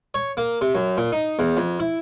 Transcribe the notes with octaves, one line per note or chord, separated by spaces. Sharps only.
C#5
A#3
C3
F#2
A#2
D#4
E2
F2
E4